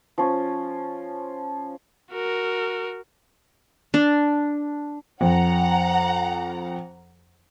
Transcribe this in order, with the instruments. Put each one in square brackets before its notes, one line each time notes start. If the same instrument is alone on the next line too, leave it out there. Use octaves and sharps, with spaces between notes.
[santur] F3 C#4
[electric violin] F#4 A#4
[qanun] D4
[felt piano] F2 [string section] F#5 A#5